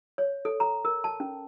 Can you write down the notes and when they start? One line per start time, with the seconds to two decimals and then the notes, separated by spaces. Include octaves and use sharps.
0.18 C#5
0.45 A4
0.60 A#5
0.85 A#4
1.04 A5
1.20 C#4